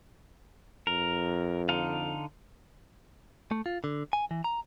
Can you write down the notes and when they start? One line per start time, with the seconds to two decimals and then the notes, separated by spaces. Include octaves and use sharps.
0.87 F2 A#4
1.69 D3 D#4 F5
3.51 A3
3.66 F4
3.84 D3
4.13 G#5
4.31 E3
4.44 A#5